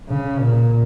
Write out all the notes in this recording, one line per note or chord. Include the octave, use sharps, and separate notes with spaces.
C#3
A#2